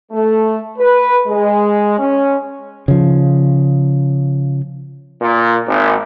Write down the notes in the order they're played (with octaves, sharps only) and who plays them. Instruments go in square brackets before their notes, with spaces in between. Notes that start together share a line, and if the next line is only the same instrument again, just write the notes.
[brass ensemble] A3
B4
G#3
C#4
[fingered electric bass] C#3 F3
[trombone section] A#2
G#1